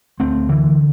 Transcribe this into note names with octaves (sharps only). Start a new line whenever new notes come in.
D2 A3 C4
D3 E3